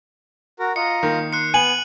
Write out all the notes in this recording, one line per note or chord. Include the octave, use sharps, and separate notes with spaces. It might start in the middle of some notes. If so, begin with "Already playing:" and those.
F#4 A#4
F4 D#5 A#5 C#7
D#3 A#3
C6 F#6 C#7
B3 G#5 D#7 F#7